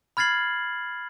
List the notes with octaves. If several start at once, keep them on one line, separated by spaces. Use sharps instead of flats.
B5 F6 G#6 A6 C7 F#7